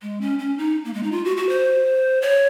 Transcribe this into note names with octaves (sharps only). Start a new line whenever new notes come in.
G#3
C#4
C#4
D#4
A#3
G#3
D#4
F4
F#4
F#4
C5
C#5